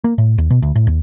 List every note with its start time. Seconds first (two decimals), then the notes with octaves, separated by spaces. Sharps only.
0.04 A#3
0.18 A2
0.38 D#2
0.50 B2
0.62 D2
0.75 A2
0.87 D#2